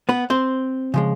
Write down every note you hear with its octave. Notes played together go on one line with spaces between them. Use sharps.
B3 B4
C4 C5
C#3 F3 G#3